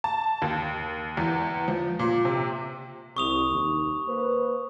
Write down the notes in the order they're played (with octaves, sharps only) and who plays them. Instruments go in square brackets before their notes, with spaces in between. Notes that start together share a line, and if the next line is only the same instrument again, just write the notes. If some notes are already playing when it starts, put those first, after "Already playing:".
[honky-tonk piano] A5
D#2
E2
F3
A#2
C3
[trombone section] C2 [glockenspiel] C#6 D#6 F7
[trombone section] D#2
A#3 B4 C5